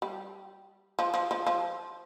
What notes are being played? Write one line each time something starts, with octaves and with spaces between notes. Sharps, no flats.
G3
F3
F3
F3
F3